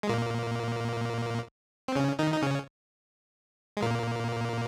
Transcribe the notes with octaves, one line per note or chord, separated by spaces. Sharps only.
G#3
A#2 A#3
C4
C#3 C#4
D#3 D#4
D#4
C#3 C#4
G#3
A#2 A#3